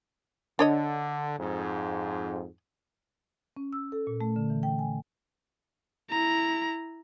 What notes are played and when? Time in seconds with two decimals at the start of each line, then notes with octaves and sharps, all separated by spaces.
0.59 D3 D4 C#5 D#5
1.38 F2 G#2
3.57 C#4
3.73 E6
3.92 A4
4.07 A#2
4.21 A3
4.36 D3
4.50 E3
4.63 G5
4.79 G#5
6.10 E4 A#5